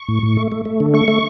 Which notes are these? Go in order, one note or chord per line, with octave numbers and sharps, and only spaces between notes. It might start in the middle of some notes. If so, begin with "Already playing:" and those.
Already playing: C#6
A2
A2
A3
A3
A3
D3
A3 C#6
A3